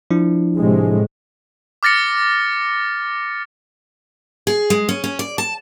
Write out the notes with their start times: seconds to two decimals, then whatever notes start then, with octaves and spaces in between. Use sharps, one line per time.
0.11 F3 D4 E4
0.57 A2 C3 G#3
1.83 D6 F6 A6 A#6 C#7
4.47 G#4
4.70 G#3
4.89 C#4
5.04 C#4
5.19 D5
5.38 A5